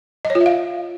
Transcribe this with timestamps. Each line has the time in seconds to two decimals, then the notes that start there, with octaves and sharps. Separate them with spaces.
0.25 D#5
0.30 C#5
0.35 F4
0.41 E5
0.46 F5